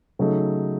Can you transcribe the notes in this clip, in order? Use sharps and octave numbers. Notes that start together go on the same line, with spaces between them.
C#3 F#3 A3 D#4 A4